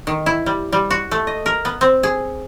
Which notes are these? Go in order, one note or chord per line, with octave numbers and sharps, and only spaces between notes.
D#3
E4
G3
G3
F#4
A3
D#5
A#4
B3
C4
G#4